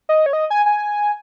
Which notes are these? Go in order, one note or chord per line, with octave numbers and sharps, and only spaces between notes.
D#5
C#5
D#5
G#5
G#5